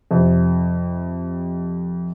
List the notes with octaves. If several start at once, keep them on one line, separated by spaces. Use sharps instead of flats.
F2 C3